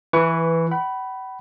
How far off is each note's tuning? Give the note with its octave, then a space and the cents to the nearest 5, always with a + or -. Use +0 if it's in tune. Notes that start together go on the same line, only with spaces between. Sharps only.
E3 +5 B4 +0 C#6 +30
F#5 +45 B5 +0